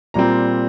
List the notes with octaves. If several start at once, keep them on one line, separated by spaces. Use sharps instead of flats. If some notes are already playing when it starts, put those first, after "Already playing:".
A#2 G3 C4 A#5